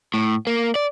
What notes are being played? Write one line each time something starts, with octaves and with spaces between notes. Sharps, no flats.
A2
A#3
D5